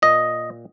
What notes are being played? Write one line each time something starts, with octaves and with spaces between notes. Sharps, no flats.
A#2 D#5